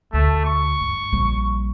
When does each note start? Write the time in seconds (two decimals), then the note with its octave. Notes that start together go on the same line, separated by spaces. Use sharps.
0.13 D2 A3
0.45 C#6
0.81 G2
1.12 A#1 G3